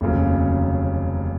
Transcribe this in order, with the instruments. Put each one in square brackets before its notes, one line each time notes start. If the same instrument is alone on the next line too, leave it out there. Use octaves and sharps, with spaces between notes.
[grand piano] F1 D#2 C#3 F#3